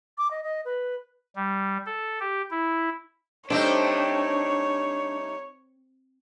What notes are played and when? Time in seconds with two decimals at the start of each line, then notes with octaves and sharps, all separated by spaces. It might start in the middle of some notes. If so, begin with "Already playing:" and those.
0.18 D6
0.31 D#5
0.44 D#5
0.65 B4
1.36 G3
1.86 A4
2.20 G4
2.51 E4
3.50 G3 A3 C4 D4 D#4 C#5